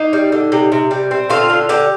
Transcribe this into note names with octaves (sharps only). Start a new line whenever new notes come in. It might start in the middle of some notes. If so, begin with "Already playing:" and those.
Already playing: A#3 D#4
G3
D3
C3
C3
G3
C4
D3 F4
D3
D3 G4